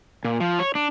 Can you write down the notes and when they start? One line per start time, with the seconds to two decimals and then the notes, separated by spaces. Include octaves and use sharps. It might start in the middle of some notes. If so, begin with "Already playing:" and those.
0.25 A#2
0.40 F3
0.59 C#5
0.75 D4